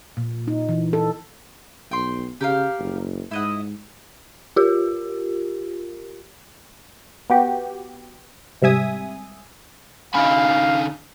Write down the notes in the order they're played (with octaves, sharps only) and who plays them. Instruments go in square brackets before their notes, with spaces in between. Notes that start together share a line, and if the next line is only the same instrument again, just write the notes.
[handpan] A#2
D#4
E3
A4
[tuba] B1 [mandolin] G5 C6
[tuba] C#3 [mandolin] G4 A#4 F5
[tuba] F#1
[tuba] G#2 [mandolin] E4 D#5 F#5
[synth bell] F4 G4 A#4
[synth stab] B3 F#4 G4
G#2 C3 G3 E5 G#5 D#6
[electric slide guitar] D3 C#4 G#5 [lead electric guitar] D#4 B5 [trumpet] F5